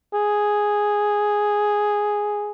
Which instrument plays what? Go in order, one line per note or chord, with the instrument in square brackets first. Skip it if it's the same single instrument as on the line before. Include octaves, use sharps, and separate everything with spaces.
[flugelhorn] G#4